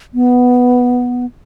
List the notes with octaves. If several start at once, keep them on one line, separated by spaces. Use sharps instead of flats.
B3